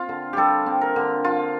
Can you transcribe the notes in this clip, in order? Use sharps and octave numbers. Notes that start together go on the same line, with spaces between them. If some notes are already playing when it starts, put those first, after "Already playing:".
Already playing: C4 F4
D3
G3 G4 A4
C4
A#4
D3
D3 F4